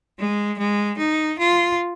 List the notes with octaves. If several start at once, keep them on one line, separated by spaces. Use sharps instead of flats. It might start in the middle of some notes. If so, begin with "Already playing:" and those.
G#3
G#3
D#4
F4